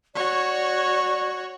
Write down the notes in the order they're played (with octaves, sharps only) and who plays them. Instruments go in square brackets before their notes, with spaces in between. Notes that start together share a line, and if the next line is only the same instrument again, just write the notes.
[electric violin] F#4 C#5 [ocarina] D5